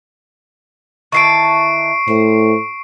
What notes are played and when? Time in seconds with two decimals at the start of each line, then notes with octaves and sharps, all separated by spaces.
1.12 D#3 E3 A5 C#6 C7 D7
2.08 A2 C5